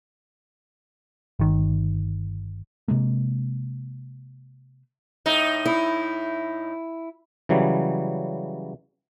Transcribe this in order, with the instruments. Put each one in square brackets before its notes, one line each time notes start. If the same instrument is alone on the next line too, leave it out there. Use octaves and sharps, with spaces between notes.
[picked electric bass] G1 D#3
C3 G#3 A#3
[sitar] A2 D#4
[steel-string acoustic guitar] E4
[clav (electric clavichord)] C#3 E3 F#3 G3